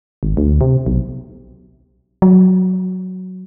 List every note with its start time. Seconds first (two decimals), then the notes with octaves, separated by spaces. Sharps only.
0.23 G#1
0.37 D2
0.61 C3
0.86 B1
2.22 F#3